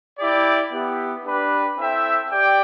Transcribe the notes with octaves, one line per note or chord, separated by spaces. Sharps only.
E4 G4 D5
B3 E4 G4
D4 G4 B4
C4 E4 A4 E5 G5
G4 D5 G5